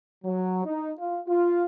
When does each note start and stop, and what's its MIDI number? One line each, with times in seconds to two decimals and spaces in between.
0.24 0.61 54
0.65 0.91 63
0.98 1.20 65
1.28 1.66 65